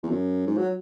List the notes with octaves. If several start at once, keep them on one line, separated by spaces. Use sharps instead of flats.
E2
F#2
G#2
F#3